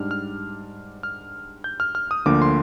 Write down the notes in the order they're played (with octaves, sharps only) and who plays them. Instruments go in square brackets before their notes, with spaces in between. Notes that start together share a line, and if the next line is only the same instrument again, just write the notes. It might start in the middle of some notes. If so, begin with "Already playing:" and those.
Already playing: [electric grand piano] G#2 G3 D4 F6
F6
F6
G6
F6
F6
D#6
D2 D3 F3 A#3 D6
C6